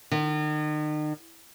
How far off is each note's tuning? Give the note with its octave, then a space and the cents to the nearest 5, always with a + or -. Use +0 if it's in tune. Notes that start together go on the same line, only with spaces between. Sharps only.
D#3 -40